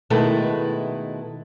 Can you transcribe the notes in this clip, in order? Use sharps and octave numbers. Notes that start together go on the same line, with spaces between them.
B2 D#3 G#3 A3 E4 B4